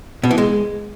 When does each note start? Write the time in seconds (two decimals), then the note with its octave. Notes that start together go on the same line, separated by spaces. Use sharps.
0.23 B2
0.31 E3
0.38 G#3